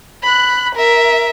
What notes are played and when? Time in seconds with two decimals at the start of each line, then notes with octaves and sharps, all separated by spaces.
0.22 B5 F#6
0.75 A#4 E5